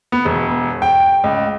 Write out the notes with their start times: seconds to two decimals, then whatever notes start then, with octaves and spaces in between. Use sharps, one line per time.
0.12 B3
0.25 E1
0.82 G5
1.24 C#2